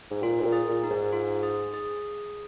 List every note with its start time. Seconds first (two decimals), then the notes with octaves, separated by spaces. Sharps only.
0.11 G#2
0.23 A#2 F4
0.40 G#2
0.45 A#2
0.53 G#4
0.68 A#2
0.84 D#4
0.90 G#2
1.13 F4
1.43 G#4
1.74 G#4